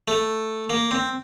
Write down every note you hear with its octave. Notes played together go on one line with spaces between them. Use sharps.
A3
A#3
C4